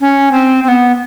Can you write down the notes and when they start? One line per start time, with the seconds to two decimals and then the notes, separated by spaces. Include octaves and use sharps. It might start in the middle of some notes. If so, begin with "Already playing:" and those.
0.01 C#4
0.32 C4
0.63 C4
0.68 B3